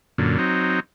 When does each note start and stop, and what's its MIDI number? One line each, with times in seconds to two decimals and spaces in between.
0.18 0.38 42
0.18 0.38 46
0.18 0.38 50
0.39 0.80 54
0.39 0.80 60
0.39 0.80 63